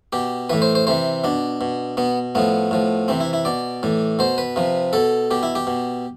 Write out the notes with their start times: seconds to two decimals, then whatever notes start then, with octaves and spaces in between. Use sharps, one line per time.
0.13 B2 G4
0.49 A2 E3 B4
0.62 C5
0.75 C5
0.87 C3 E3 C5
1.24 B2 D4
1.61 B2
1.97 B2 B3
2.35 A2 F3 B3
2.71 A2 F3
3.08 C3 E3 C4
3.20 E4
3.33 E4
3.45 B2 D5
3.83 A2 E3
4.19 B2 C5
4.38 B4
4.56 C3 F3
4.93 B2 A4
5.31 B2 G4
5.43 E4
5.55 G4
5.67 B2